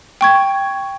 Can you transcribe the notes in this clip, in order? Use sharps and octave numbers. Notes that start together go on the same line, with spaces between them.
G5 C#6 G#6